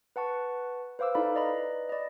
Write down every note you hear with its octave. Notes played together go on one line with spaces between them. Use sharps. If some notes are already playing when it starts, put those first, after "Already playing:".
B4 F#5 A5 C#6
B4 C5 F5 D6 E6
D#4 E4 A4 D5 F5 B5
B4 D5 D#5 A#5 B5
D5 D#5